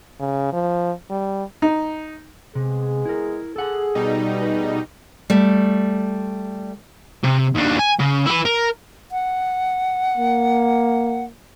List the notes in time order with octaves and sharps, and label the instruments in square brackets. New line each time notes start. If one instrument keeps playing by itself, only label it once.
[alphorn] C#3
F3
G3
[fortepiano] D#4
[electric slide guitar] C3 [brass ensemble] G#3 B3 G#4
[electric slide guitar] E4 A#4
[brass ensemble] G#4 [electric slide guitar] A4 F#5
[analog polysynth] B2 G3 D#4
[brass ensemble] A3 G#4 [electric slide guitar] B4
[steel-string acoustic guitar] G3 A3
[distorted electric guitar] C3
D#2 D4
G#5
C#3
E4 B4
A#4
[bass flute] F#5
[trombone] A#3